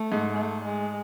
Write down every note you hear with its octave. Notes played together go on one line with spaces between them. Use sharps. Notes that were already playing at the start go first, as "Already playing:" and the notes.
Already playing: A3
G#2
A3
G#3